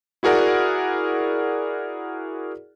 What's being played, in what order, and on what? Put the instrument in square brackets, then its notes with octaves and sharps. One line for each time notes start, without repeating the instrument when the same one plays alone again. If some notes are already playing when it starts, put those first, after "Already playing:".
[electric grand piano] E4 F#4 G#4 A#4 D5 F#5